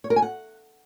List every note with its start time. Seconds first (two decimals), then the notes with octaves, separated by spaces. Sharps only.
0.04 C#5
0.10 A#4
0.16 G#5
0.22 F#5